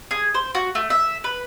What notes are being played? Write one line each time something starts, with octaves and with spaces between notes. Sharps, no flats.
G#4
C5
F#4
A3
E5
B4